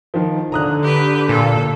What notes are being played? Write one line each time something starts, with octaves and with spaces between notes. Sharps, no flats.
D#3 F3
D3 A#5 D#6 F#6
G4 B4
A#2 A4